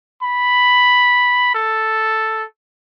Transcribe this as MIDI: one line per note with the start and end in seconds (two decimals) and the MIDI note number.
0.22 1.50 83
1.55 2.44 69